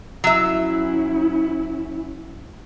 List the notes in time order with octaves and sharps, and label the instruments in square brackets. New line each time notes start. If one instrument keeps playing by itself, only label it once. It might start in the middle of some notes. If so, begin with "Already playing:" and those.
[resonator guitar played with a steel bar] F#3 E5 [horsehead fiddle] C#4 E4